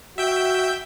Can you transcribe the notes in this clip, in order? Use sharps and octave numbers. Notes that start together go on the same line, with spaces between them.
F#4 E5 G5 G6